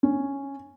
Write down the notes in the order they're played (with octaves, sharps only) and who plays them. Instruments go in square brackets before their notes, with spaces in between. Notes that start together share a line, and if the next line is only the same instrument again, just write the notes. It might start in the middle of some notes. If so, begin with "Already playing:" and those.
[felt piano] C#4